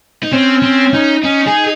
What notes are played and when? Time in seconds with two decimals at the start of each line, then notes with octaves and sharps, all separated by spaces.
0.23 D#4
0.32 C4 C#4
0.62 C4
0.94 D#4
1.24 C#4 D#4
1.47 G#4